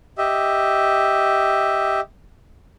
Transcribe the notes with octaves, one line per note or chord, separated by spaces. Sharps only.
G4 D#5 E5